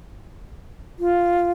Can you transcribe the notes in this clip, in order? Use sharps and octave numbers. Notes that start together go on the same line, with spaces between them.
F4